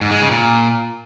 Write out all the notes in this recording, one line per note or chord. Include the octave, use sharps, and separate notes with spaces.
G#2
G#3
C#3
A#2